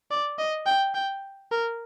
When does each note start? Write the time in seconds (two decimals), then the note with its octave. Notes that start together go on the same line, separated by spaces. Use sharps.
0.11 D5
0.39 D#5
0.66 G5
0.95 G5
1.52 A#4